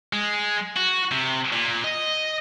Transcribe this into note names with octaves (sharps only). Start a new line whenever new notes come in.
G#3
F#4
C3
A#2
D#5